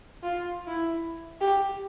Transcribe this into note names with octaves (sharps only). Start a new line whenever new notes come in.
F4
E4
G4